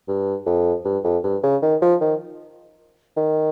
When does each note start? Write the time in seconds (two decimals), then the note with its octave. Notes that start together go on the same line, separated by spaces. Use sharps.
0.08 G2
0.46 F2
0.85 G2
1.04 F2
1.24 G2
1.43 C#3
1.62 D#3
1.82 F3
2.01 D#3
3.17 D#3